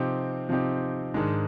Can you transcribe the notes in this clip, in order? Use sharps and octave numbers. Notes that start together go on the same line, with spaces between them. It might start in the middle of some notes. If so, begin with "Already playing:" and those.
Already playing: C3 F3 C4 D#4 G4
C3 F3 C4 D#4 G4
G#2 D#3 G#3 D4